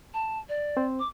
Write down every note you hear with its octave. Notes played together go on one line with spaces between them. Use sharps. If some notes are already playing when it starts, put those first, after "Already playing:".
A5
D5
C4 C5
D6